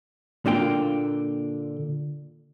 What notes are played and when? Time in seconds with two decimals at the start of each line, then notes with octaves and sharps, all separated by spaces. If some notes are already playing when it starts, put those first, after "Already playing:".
0.46 A#2 D3 A#3 F4 G5